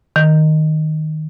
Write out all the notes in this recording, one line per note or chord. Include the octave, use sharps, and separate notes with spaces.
D#3